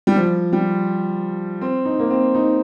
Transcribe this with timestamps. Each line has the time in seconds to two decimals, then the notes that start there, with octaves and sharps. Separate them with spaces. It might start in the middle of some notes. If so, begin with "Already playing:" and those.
0.07 G3
0.16 F3
0.53 G3
1.61 C4
1.85 D#4
1.99 A#3
2.10 C4
2.35 D#4